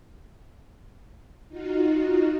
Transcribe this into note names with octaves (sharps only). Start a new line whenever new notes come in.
D#4 F4 F#4